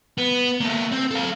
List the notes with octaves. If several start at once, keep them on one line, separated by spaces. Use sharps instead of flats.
B3
A#3 A4
C4
A4 F5